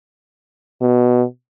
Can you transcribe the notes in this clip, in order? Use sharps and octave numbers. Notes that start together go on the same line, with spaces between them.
B2